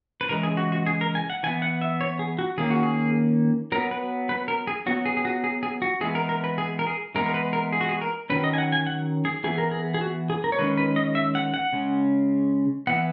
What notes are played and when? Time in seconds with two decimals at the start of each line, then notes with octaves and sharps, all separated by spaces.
0.21 B4
0.29 C#3 E3 G#3 A#4
0.43 G#4
0.57 F#4
0.72 F#4
0.86 G#4
1.01 A#4
1.15 G#5
1.30 F#5
1.43 E3 G#5
1.47 B3
1.62 F#5
1.81 E5
2.01 C#5
2.19 G#4
2.39 F#4
2.58 D#3 A#3 C#4 G#4
2.70 F#4
2.83 G#4
3.72 F#3 A#4
3.76 B3
3.91 B4
4.29 B4
4.48 A#4
4.67 G#4
4.86 F#3 B3 F#4
5.06 G#4
5.17 G#4
5.25 F#4
5.44 G#4
5.63 G#4
5.82 F#4
6.01 E3 G#3 B3 G#4
6.15 A#4
6.29 A#4
6.44 B4
6.58 G#4
6.79 A#4
6.87 G#4
7.15 E3 G#3 B3 A#4
7.26 A#4
7.34 B4
7.53 A#4
7.73 G#4
7.81 F#4
7.89 G#4
8.01 A#4
8.30 D#3 F#3 C#4 B4
8.44 D#5
8.54 G#5
8.58 F#5
8.72 G#5
8.87 F#5
9.25 G#4
9.44 E3 B3 G#4
9.58 A#4
9.71 G#4
9.94 G#4
10.01 F#4
10.30 G#4
10.44 A#4
10.52 C#5
10.59 D#3 G#3 C#4 B4
10.77 B4
10.96 D#5
11.15 E5
11.35 F#5
11.54 F#5
11.73 C#3 G#3 C#4
12.87 E3 B3 F#5